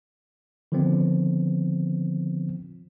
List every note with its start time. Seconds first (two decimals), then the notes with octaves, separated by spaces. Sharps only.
0.72 D3 D#3 F3 B3 C4